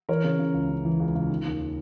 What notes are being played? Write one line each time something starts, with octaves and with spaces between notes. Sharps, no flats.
E3 A#4 C#5
C#3
C#3
C#2
C#3
E3
C#2
C#2
D#3
D#2